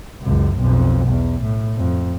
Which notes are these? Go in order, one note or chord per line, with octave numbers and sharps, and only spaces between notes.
C#2 F#2
B1 F2
E2
A2
F2